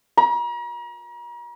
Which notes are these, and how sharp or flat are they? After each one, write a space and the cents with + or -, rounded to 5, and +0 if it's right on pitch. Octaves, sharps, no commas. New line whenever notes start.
A#5 +40